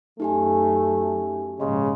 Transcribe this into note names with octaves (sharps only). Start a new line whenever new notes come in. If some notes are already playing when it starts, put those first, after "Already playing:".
F#2 A3 D#4 G4 G#5
A#1 G#2 C#3 D#5 C6